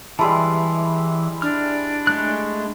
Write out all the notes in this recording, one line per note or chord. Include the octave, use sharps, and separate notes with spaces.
E3 G3 G#3 E4 A5 C6
D4 F6
G#3 A3 F#6